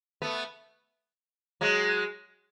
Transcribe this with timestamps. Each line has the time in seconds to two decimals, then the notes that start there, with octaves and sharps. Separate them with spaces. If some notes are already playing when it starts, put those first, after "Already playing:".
0.22 A3 B3
1.61 F#3 G#3